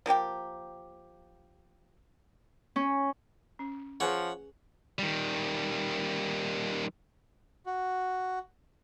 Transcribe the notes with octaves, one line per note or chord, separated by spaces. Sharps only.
F3 A#3 G4 G5
C#4
C#4
F3 G#4 B4 C#5 F#5 G#5
D#3 G3
F#4